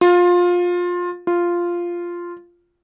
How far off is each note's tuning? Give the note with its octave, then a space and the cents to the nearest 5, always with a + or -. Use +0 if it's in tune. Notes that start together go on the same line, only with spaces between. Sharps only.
F4 +20
F4 -5